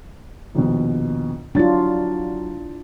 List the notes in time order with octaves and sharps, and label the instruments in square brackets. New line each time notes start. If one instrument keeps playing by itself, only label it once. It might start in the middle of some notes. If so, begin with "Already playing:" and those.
[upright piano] A#1 D#2 B2
[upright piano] F#3 A6 [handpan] D4 E4 F4